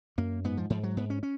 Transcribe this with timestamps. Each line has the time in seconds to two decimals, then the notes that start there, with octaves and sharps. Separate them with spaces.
0.18 F#2 A#3
0.44 G#2 B3
0.57 F3
0.70 G#2 F3
0.83 F#3
0.97 G#2 B3
1.10 C#4
1.23 C#4